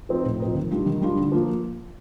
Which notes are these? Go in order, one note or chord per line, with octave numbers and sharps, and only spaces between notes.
F3 C4 D#4
A2
F3 C4 D#4
D#3
G3 D4 F4
D#3
G3 D4 F4
D3
F3 A#3